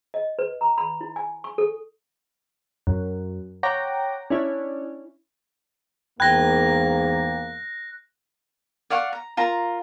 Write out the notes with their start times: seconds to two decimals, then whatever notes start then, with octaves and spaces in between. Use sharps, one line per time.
0.14 D#5
0.39 B4
0.61 A#5
0.78 B5
1.01 E4
1.16 G#5
1.44 C#6
1.58 A4
2.87 F#2
3.63 C#5 F#5 G5 A#5 D6 A#6
4.30 C#4 D4 E4 C#5
6.20 E2 G#2 A#3 G5 B5 F#6 G#6 A#6
8.90 D5 F5 F#5 C#6
9.13 A#5
9.37 F4 A#4 A#5